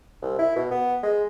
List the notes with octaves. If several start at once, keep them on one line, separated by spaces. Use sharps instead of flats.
C2
E4
B2
B3
G#3